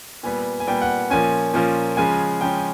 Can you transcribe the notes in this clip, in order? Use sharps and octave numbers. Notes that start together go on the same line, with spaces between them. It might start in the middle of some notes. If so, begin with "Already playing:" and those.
A#2 G3 B3 G#5
G#5
A#2 G3 B3 G5
F#5
A#2 F3 A#3 C#4 G#5
A#2 F3 A#3 C#4
C#3 F3 G#3 C#4 G#5
C#3 F3 G#3 C#4 G5